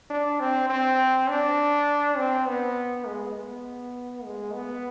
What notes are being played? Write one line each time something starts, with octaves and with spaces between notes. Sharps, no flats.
D4
C4
C4
D4
C4
B3
G#3
B3
G#3
B3